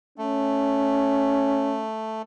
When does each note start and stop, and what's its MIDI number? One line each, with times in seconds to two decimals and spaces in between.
0.18 2.22 57
0.18 1.85 61